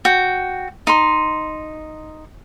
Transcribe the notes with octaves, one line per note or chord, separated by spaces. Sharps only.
F#4 G5
D#4 C6